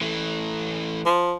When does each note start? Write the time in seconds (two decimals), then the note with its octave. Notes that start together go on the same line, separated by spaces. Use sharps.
0.01 E3 A3
1.06 F3